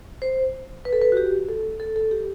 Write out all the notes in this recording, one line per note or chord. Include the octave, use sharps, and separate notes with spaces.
C5
B4
A4
B4
F#4
G4
A4
A4
A4
G4